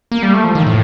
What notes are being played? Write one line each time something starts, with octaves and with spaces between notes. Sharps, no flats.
A#3
G3
A3
F3
D#3
A2